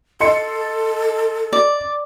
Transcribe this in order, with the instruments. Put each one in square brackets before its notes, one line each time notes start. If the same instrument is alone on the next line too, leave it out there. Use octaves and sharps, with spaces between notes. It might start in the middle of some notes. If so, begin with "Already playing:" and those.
[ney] A4 [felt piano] D#5 C6 C#7
[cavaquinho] D5